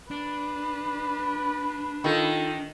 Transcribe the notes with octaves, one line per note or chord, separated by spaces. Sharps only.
D4 B4
D#3 D#4 F4 A4